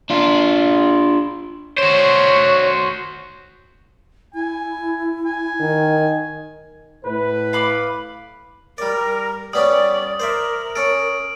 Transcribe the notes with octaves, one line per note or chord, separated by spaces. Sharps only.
D4 F4
F#4 C5 C#5
E4 G#5
G#5
D#3 D#4
A2 B4
F5 B5 D6
G3 A#4 D5
G3 B3 C#4 D5 D#6
A#4 C5 D5 E5
C#4 A4 D7